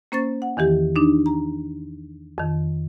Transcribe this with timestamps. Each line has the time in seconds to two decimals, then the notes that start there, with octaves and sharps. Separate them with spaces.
0.12 A#3 C#4 C5 C#6 A6
0.42 F#5
0.57 E2 D#3 E3 G4
0.96 D4 D#4
1.26 A#5
2.38 F2 D#3